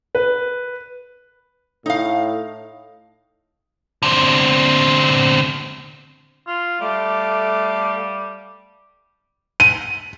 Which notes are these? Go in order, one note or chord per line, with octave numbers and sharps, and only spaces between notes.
B4
A2 D#4 F5
D3 C4
F4
G3 A3 F5 D6
D#7